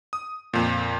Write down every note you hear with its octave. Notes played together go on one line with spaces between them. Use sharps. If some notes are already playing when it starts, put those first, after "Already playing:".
D#6
F2 A#2